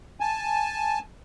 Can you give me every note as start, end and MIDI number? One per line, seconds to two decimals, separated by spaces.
0.20 0.99 80
0.20 0.99 81